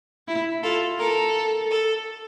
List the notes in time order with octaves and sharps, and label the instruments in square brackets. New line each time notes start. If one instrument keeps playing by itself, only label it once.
[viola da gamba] E4
[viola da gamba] F4 [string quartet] A4
[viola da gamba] A4 [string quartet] A#4
[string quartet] A4